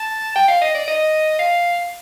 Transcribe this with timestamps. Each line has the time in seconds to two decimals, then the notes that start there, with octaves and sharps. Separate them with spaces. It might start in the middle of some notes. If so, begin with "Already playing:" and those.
Already playing: A5
0.36 G5
0.48 F5
0.61 D#5
0.74 D5
0.88 D#5
1.39 F5